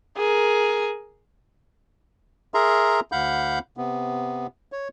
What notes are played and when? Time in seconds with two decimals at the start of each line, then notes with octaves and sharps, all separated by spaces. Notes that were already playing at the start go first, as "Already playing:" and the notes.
0.17 G#4 A#4
2.54 G#4 A#4 E5 A#5 C6
3.12 D2 F5 F#5 B5 G6
3.77 C3 B3
4.72 C#5